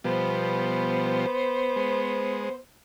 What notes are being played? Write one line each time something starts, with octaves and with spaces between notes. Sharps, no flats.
B2 F3 G3 B3 C5
G#3